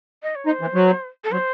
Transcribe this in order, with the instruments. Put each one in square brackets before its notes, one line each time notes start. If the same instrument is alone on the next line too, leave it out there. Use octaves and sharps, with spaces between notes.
[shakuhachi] D#5
C#5
[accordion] D#4 [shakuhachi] C5
[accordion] E3
F#3
[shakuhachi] A4
[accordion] F#3 [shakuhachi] C5